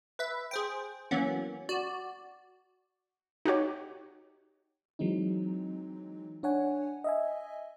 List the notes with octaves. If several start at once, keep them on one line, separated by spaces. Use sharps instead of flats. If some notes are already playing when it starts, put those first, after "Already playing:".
B4 E5
G#4 C5 G5
E3 F#3 A#3 B3 C#4
F#4 D5
D#4 F#4 G4 C#5
E3 F#3 G#3 C4 D#4
D4 C#5 F#5 G#5
D#5 E5 G#5